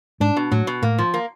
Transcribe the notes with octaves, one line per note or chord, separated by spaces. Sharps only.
G#2 D4
B2
A2 F#3
B2
A2 A#3
F3
A#3